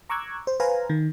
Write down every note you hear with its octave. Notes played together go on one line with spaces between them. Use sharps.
A#5 C#6 D6 E6 F#6 G#6
C5
B4 C5 F5 G#5 A#5
D#3